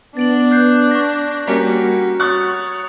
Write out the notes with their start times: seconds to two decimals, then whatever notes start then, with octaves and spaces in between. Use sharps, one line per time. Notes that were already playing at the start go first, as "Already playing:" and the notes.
0.17 B3 D4 A6 D7 F#7
0.51 F#6 G6 C7
0.91 C#6 A#6
1.47 G3 A#3 C#4 F#4 A#5 B6 C#7
2.20 C#5 C#6 D#6 F#6 A6